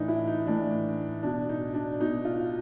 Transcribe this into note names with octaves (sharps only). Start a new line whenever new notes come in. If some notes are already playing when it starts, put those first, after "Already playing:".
Already playing: A2 E3 D4 D#4
E4
D#4
A2 E3 D4
B2 D4
D#4
D4
B2 D#4
F4